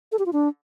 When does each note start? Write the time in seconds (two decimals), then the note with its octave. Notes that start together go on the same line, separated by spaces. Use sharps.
0.12 A4
0.19 G4
0.26 F4
0.33 D4